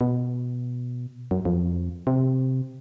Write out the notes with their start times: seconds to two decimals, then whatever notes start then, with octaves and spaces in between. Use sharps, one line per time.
0.01 B2
1.31 F#2
1.45 F2
2.07 C3